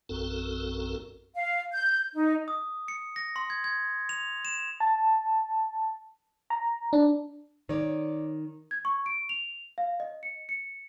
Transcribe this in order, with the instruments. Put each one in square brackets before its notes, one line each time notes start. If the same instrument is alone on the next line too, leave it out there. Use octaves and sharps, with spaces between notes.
[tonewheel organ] A#1 F#2 C4 F#4 A4 A#4
[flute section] F5
G6
D#4
[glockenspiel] D#6
C#7
A#6
C6
G#6
G#6
F7
E7
[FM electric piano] A5
A#5
D4
[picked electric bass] D#3 [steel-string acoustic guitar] C#5 D5
[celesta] G#6
C#6
D7
F7
F5
D#5
C#7
C#7